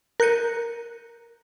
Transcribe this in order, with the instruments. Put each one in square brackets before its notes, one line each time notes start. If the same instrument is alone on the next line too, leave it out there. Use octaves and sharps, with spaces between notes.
[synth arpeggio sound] A#4 F#6 G6 C#7 D#7